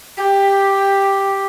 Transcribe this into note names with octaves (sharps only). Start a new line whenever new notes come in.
G4